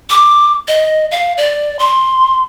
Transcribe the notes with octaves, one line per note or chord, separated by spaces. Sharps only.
D6
D#5
F5
D5
C6